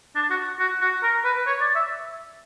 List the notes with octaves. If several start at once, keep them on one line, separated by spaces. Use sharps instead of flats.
D4
F#4
F#4
F#4
A#4
B4
C#5
D5
E5